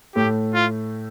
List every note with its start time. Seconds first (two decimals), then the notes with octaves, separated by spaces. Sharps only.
0.15 A2 A3 G4
0.54 F4